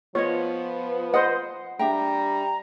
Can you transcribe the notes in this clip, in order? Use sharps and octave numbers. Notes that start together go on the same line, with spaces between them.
F3 B3 F4 C#5 D#5
C5 D#5 F#5
G3 D4 E5 G5 A#5